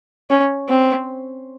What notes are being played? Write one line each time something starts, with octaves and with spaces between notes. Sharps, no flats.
C#4
C4